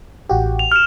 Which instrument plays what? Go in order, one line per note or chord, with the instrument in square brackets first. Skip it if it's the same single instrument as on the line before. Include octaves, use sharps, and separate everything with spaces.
[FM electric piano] A1 F#4 G4
[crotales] F7
F6 E7